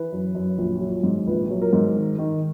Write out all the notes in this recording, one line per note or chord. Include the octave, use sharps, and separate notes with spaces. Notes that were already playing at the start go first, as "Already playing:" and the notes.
Already playing: E3 B4
F#2
F#2
A#1
F#3
G#2
A#1 B4
F#3
A#4
G#2
D#3
D#3